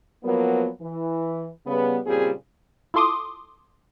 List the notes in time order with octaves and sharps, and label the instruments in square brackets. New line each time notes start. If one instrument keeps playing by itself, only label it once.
[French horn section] F3 F#3 A#3 B3
E3
C#3 G3 B3
A#2 C#3 G3 C4 G#4
[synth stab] E4 F4 A4 C6 D6 D#6